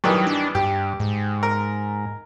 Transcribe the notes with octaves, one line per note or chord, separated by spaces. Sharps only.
G2 D#3 E3 F#3
D4
G2 G4
G#2
A#4